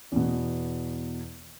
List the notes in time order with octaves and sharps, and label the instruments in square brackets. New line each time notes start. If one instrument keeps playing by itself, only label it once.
[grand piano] E2 B2